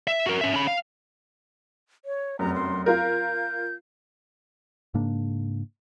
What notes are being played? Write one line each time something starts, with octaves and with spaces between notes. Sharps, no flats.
E5
F#4 A#4
C#4 E5
C#4 B5
F5
C#5
F1 F#2 A#5
C6
F4 A#4 G6
G#2 C#3 A#3 D4